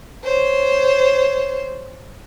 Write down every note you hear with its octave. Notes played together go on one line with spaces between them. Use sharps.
C5 C#5